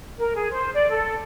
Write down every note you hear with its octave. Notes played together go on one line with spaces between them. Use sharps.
A#4
G#4
C5
D5
A4